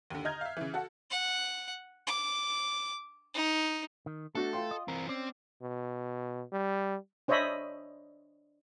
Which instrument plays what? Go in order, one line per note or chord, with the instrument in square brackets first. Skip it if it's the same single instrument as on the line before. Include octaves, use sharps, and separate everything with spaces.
[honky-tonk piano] D#2 D3
D#5 A#5 F6 G6 G#6
E5 F5
C#3 E3
F#4 A4 F#5
[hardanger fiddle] F#5
D6
D#4
[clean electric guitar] D#3
[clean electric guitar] A3 [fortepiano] D4 F#4 [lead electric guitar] A4
[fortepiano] F4 G5 C6
[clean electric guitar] D#5
[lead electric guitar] E3 C4 [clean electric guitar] A#4
[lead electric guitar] C4 [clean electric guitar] C#4 D5
[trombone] B2
G3
[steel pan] D4 C5 C#5 D#5 E5 B5